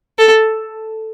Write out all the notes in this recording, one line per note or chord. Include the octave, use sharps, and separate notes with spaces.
A4